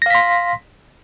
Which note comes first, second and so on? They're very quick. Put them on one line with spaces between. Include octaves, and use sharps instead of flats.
A#6 F5 B6 C6